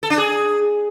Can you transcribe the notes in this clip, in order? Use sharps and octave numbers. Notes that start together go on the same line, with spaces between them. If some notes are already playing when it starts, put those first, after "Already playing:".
A4
D4
G#4